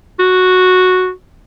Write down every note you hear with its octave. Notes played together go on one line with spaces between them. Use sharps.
F#4